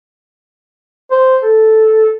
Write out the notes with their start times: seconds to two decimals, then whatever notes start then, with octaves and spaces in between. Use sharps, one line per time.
1.11 C5
1.43 A4